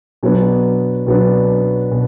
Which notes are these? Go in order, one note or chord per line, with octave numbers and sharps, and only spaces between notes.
B2 F#3 B3 D4
B2 F#3 B3 D4
B2